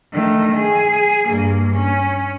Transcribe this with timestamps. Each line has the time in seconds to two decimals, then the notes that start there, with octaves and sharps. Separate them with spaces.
0.13 D#3 A3
0.56 G#4
1.28 G2 A#3
1.74 C#4